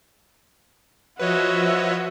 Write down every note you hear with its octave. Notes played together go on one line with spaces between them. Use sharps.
F3 F#4 B4 C#5 D#5 E5